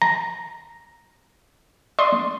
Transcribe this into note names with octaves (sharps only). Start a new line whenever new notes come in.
A#5
D5 C6 D#6